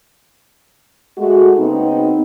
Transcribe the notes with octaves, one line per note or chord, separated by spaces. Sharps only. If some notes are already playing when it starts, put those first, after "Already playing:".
G#3 A3 F#4
C#3 B3 C4 D#4